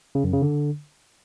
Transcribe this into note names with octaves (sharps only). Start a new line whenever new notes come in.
C#3
F#2
C#3
D3